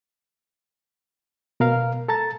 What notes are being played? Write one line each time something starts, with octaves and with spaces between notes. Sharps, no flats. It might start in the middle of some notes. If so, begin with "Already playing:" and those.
B2 A#4 F5
A4 A5 A#5 A6